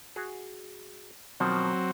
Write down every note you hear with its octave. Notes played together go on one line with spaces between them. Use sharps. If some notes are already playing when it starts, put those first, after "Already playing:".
F#4 G#4
B2 D#3 F3 F#3 C4